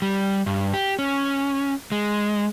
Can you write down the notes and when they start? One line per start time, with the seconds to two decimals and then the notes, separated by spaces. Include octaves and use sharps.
0.02 G3
0.46 G2
0.74 G4
0.99 C#4
1.92 G#3